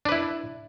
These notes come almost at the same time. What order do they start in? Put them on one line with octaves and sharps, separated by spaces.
D4 B4 E4